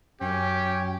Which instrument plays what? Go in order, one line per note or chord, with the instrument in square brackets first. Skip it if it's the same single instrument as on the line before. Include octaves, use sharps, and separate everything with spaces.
[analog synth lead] F#2 [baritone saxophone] C#4 [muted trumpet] G4 [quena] G5